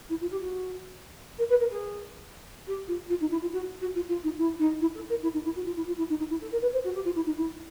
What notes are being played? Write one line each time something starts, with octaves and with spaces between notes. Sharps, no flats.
E4
F4
G4
F#4
A#4
B4
A#4
G#4
G4
F4
F4
D#4
E4
F4
F#4
F#4
F4
F4
D#4
E4
D#4
E4
A4
A#4
E4
D#4
E4
F#4
F4
E4
F4
E4
D#4
D#4
E4
A4
A#4
B4
C5
F#4
G4
F4
E4
D#4
E4